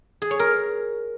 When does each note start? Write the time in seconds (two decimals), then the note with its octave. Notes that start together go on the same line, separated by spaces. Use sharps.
0.22 G#4
0.31 C#5
0.40 A#4